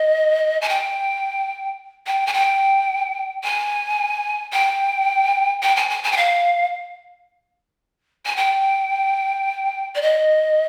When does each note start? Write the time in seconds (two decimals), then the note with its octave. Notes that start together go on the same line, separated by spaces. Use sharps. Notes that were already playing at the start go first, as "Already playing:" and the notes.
Already playing: D#5
0.61 G#5
0.69 G5
2.06 G5
2.26 G#5
2.33 G5
3.43 G#5
4.52 G5
5.62 G5
5.76 G#5
5.89 G#5
6.03 G#5
6.11 G5
6.17 F5
8.26 G#5
8.36 G5
9.95 D5
10.01 D#5